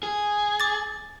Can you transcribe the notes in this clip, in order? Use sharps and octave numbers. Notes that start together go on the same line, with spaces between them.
G#4
D6 A6